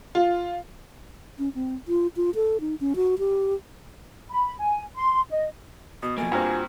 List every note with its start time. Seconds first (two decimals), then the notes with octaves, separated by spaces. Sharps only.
0.15 F4
1.39 C#4
1.55 C4
1.88 F4
2.16 F4
2.35 A4
2.61 D#4
2.81 C#4
2.96 F#4
3.19 G4
4.30 B5
4.59 G#5
4.95 C6
5.30 D#5
6.03 B2 D#6
6.18 F3 A3 A#3 G#5
6.32 G2 A#3 C4 F4 F#4